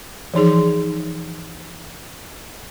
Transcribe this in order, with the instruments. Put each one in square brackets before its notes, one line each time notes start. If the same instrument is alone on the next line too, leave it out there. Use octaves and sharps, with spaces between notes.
[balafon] E3 F3 D#4 G#4